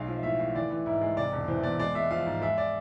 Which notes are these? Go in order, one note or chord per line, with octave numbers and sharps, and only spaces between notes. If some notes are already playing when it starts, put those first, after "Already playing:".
Already playing: B1 G#3 F5
F3
F5
A2 E5
A2 F5
E3 D5
E3
G#2 E4
G#3
C3 D5
E1
E3 C5
E2 D5
G#3 D5
G#3 E5
F3 F5
G#2
G#3 E5
D5